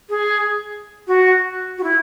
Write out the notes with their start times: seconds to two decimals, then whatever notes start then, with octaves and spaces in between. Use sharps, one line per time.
0.10 G#4
1.07 F#4
1.78 F#4
1.83 E4